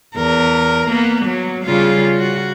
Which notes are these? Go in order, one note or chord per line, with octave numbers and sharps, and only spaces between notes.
E2 A#4
A#3 B3
F#3
C#3 G3 F4
F#4